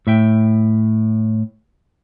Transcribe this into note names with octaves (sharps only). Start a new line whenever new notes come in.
A2 E5 G5